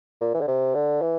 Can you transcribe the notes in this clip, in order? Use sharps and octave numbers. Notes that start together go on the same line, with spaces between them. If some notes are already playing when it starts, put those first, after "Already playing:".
A#2
E3
D3
C3
D3
E3